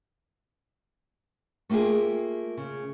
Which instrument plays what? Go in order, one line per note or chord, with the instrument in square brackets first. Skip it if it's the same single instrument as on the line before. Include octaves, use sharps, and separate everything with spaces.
[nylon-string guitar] A3 A#3 F4 G4 G#4
C#3